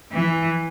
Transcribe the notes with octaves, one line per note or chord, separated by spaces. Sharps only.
E3